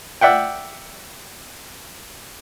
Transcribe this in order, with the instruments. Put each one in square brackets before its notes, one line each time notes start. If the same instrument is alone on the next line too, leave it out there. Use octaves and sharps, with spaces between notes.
[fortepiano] D5 E5 F#5 G5